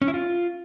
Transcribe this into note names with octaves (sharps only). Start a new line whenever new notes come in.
C#4
E4
F4